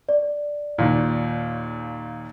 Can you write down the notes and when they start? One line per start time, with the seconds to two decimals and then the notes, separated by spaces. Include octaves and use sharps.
0.09 D5
0.78 D#2 A#2